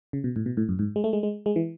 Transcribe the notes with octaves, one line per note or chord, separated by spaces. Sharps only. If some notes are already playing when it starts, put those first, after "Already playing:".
C#3
B2
A2
B2
A2
F#2
G#2
G#3
A3
G#3
G#3
G#3
E3